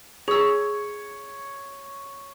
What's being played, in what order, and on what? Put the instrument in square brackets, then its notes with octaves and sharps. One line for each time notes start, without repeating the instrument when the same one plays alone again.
[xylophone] G#4 E6 [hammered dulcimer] C#5